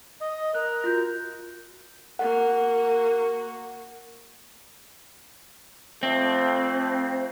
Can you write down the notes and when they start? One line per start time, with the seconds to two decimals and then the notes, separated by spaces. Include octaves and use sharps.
0.20 D#5
0.54 A#4 F#6
0.84 F4 F#4 G6
2.19 A#3 F#4 F#5
6.03 F2 A3 C4